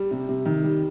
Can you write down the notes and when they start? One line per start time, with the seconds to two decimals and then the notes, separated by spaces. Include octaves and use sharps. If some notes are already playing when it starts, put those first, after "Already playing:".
Already playing: G3
0.11 C3
0.29 C3
0.45 D#3
0.63 G3